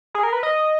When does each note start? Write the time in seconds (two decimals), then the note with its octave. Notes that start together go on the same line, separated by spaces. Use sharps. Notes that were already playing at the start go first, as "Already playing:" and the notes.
0.14 G#4
0.23 A#4
0.33 B4
0.43 D#5